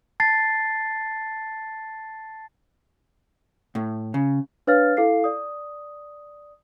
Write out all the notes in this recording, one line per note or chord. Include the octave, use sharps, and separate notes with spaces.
A5 A6 C7
A2
C#3
D4 B4 C#5 F5 F6 A6
E4 A4 F5 C7
D5 D#6